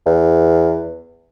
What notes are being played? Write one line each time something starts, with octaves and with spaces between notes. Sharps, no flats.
E2